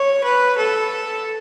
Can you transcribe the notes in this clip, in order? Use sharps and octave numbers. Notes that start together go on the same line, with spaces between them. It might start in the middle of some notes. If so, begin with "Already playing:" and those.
Already playing: C#5
B4
A4